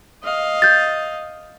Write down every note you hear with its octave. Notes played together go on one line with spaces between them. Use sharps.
D#5 F5
G6 A6